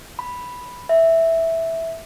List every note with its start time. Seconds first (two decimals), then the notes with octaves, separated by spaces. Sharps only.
0.19 B5
0.89 E5